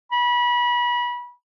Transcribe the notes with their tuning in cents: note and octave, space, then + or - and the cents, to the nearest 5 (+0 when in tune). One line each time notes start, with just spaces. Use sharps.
B5 -30